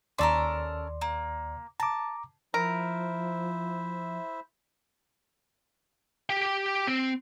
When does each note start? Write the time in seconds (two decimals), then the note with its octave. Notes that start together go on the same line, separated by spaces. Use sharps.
0.18 D#2 C#4 A4 A#4 D5 C6
1.01 A#3
1.80 A5 A#5 D6
2.54 F3 E4 A#4 C5 E5
6.30 G4 G5
6.87 C4